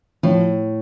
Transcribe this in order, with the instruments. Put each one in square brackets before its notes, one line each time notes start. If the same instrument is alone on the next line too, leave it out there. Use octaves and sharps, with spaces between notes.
[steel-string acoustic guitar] A2 [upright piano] F3